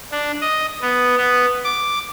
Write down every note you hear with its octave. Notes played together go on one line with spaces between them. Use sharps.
D4
D#5
B3
B3
D6